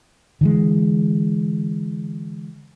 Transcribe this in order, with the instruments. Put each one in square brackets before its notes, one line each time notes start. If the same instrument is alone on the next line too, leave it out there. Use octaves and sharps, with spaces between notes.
[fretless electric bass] D3 E3 G#3